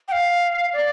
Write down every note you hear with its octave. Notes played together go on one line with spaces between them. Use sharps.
G5
F5
D5